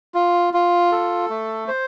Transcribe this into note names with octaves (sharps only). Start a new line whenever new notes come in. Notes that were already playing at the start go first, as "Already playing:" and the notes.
F4
F4
A4
A3
C5